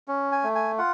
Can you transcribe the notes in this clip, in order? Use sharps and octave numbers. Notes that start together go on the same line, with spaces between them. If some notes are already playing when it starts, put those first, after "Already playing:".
C#4
G#5
A3
G#5
F4 F#5